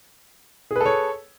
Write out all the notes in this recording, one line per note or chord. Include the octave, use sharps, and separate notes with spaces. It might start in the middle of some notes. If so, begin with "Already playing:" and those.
G#4 A4 B4 C#5